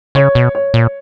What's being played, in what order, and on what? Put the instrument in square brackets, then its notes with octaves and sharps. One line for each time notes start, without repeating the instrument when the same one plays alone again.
[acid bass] C#3 [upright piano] C#5
[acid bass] B2
[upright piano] C#5
[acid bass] A#2